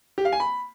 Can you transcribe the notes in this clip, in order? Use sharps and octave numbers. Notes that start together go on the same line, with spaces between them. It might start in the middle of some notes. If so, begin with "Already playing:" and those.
G4
F5
G#5
B5